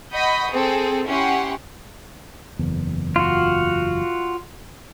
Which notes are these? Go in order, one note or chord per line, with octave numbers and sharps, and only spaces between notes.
D#5 F#5 B5 C#6 D#6 G6
C4 G#4 A4
C#4 E4 G4 F#5 C6
F#1 E2
F4 F#4